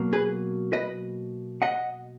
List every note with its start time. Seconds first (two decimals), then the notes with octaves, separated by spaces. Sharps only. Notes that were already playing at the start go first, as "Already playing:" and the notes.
Already playing: B2 F#3 A#3
0.13 G#4 B4
0.73 B4 D#5
1.62 D#5 F#5